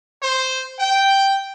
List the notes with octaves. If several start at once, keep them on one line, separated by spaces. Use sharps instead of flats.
C5
G5